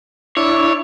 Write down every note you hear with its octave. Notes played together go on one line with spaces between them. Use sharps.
D4 E4 C#5